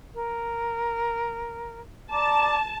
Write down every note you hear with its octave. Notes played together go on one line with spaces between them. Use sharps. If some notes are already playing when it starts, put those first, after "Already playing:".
A#4
D5 A5 A#5 D6